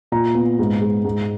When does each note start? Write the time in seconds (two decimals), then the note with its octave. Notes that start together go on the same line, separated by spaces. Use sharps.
0.12 A#2 A#5
0.35 B3
0.59 G#2
0.81 G#3
1.04 G#2